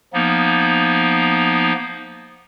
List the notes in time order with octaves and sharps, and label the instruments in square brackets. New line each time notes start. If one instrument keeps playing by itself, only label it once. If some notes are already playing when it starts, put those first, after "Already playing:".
[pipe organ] F3 A#3 B3 D#4